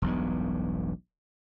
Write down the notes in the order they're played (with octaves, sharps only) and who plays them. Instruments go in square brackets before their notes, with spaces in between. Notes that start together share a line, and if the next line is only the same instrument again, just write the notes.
[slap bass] E1 B1 G2